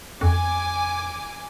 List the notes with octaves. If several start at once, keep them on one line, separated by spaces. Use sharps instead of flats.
F2 G#5 D6